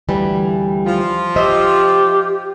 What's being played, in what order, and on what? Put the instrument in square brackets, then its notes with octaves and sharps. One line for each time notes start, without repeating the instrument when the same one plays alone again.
[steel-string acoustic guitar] D2 E3 G3
[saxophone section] F3 F4
[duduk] G4 [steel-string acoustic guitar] C5 D#5 E5